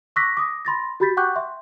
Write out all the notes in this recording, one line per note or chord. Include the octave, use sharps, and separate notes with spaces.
C#6 D6 E6 F#6 A#6 B6
D6 D#6 A#6
B5 C6 A6 A#6
F#4 G4 B5 G6 A6 B6
F#5 G5 C#6 D6 F#6 G6
E5 C6